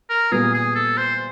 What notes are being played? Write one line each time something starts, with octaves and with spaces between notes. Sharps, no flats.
A#4
A#2 G3 B3 G#4
G#4
A4
C5